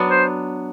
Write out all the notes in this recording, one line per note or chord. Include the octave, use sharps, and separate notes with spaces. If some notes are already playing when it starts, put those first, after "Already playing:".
Already playing: F#3 B3 D4
C5